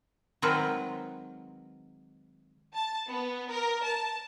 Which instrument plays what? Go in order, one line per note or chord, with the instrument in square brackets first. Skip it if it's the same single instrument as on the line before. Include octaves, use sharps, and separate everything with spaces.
[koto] D#3 F#3 G#3 C4 A#4 B4
[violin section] A5
B3
A#4
A5